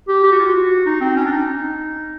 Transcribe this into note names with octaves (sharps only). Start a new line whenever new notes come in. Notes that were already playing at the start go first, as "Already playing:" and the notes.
G4
G4
F#4
F4
F#4
D#4
C4
C#4
D4
D#4